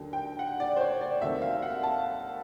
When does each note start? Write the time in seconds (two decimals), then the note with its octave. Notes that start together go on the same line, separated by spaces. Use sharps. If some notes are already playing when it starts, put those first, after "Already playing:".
Already playing: D#2 D3 F#3
0.13 G5
0.39 F#5
0.60 D5
0.76 C5
0.81 C#5
1.01 D5
1.21 D#2 D#3 F#3 A3 C4 E5
1.42 F5
1.62 F#5
1.83 A5